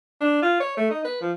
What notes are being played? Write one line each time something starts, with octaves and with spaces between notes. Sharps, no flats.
D4
F4
C#5
A3
D#4
B4
F3